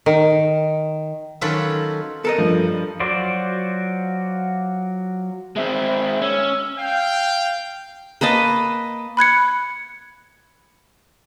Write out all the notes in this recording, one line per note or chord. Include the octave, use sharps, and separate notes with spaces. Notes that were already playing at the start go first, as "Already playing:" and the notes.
D#3
D#3 F#3 C#4 F4 A4 B4
A4 A#4 D#5
G2 F3
F#3 F4 F#4 C5 D5
G#3 C4 E5
C#4 E6
F5 G5
A#3 B4 D#5 A5
B5 F#6 G#6 C#7